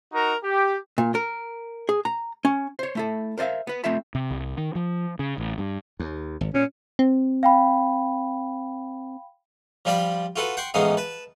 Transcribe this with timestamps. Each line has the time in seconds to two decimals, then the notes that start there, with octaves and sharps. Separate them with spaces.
0.13 D#4 F#4 A#4 A#5
0.44 G4
0.98 A#2
1.15 A#4
1.89 G#4
2.05 A#5
2.45 C#4
2.79 C5 C#5
2.95 A3 E4 A4
3.38 A#4 C5 D5 E5 F5
3.67 B3 B4
3.84 A3 C4 F4 E5 B5
4.15 C3
4.31 C2
4.58 D#3
4.75 F3
5.19 C#3
5.38 A1
5.58 G2
6.00 D#2
6.41 G#1
6.54 A#2 C#4
6.99 C4
7.43 F5 G5 B5
9.85 F3 G3 F4 D5 B5
10.36 F4 F#4 A4 B4
10.57 F#5 G5 C6 C#6
10.74 A1 G#2 B3 D#4 F5
10.97 B4 A5